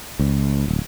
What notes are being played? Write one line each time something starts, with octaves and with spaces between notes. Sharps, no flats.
C#2
D1